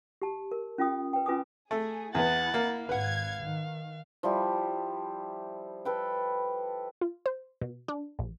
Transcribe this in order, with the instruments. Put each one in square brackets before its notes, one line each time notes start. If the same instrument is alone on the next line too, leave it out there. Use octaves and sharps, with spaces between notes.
[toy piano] G4 A5
A#4
C#4 F4 G5 D#6
B4 G5
C#4 F4 B4 G#5 D6 D#6
[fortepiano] A3 [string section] G#4
[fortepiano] E2 B3 [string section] E4 [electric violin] F#5 A6
[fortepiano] A#3
[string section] G#1 G#6 [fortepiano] B4 F#5 [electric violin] F5
[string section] D#3
[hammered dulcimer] F3 G3 E4 G4
A4 B4 G5
[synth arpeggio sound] F4
C5
B2
D4
A#1